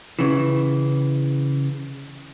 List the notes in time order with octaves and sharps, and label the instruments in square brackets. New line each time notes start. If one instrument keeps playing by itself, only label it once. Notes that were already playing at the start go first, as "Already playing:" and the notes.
[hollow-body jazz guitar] C#3 E3